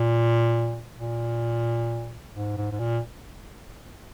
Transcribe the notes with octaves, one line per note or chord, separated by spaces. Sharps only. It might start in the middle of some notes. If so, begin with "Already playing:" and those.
Already playing: A#2
A#2
G#2
G#2
G#2
A#2